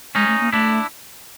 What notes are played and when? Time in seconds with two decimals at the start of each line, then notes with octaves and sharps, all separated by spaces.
0.15 G#3 C#4 D#4
0.27 A3
0.40 A#3
0.53 A3 D4 E4